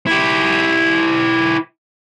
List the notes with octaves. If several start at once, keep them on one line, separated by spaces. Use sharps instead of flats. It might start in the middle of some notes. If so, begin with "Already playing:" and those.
E4 G4